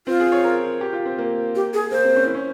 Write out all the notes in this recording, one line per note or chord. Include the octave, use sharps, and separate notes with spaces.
C4 F4
G#4
C#5
A#4
G4
F4
C4
A#3
G4
G#4
A#3 C5
C4
C#4
E4
C#4